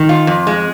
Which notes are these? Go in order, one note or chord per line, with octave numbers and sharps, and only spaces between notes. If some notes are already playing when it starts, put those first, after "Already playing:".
Already playing: D#3
F4
F2
G#3